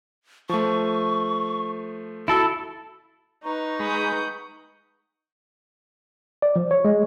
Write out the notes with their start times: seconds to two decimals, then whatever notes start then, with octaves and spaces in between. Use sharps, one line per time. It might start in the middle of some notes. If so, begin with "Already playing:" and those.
0.49 F3 A3 C#6
2.28 E4 F#4 A4
3.44 D#4 B4 A#5 C#6
3.80 G#3 F#5 B5 D#6 G6
6.42 D5
6.56 F3
6.71 C#5
6.85 G#3